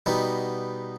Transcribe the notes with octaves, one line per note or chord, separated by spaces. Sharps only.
B2 G3 B3 D#4